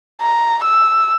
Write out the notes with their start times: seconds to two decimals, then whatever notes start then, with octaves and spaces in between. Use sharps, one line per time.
0.22 A#5
0.64 E6